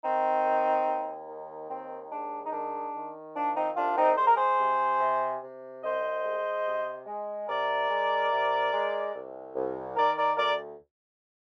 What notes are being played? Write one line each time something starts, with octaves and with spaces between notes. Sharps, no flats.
D#3 C4 D#4
D#2
D#2
D#3
D#2 C4
G#3 D4
D#4
D#3 D4
D#3
F3 D4
C4 D#4
C2 D4 F4
C4 D#4
G#3 C5
A#4
G#4 C5
C3
C3
C3
C2 C5 D#5
G#3
C3
G#3
C3 A#4 D5
G#3
C3
G#3
C2
C2
D#3 A#4 D5
A#4 D5
D2 A#4 D5